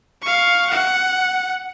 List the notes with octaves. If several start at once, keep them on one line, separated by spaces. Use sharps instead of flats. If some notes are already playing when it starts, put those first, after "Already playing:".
F5 C#6
F#5